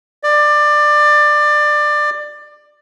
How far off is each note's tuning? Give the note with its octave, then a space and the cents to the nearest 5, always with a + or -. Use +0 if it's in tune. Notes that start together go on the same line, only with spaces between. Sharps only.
D5 +20